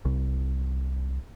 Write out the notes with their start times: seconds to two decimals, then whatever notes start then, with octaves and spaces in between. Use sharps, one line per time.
0.05 C2